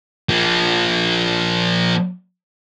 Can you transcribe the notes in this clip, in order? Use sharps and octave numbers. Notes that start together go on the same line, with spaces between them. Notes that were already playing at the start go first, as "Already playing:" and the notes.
F3 A#3